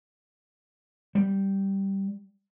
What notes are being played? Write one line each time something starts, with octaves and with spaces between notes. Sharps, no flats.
G3